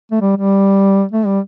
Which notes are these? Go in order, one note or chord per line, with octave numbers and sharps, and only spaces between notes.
A3
G3
G3
A3
G3